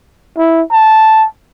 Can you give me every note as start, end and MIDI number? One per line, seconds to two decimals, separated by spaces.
0.37 0.62 64
0.71 1.26 81